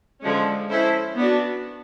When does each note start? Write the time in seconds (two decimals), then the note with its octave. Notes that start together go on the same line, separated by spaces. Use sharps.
0.21 D3 F3 G#3 C#4
0.69 C#4 E4 A4 C5
1.16 B3 D4 F#4